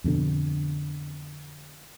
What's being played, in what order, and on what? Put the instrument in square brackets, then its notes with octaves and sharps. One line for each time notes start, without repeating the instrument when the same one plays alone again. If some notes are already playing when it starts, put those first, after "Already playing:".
[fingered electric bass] F2 B2 D3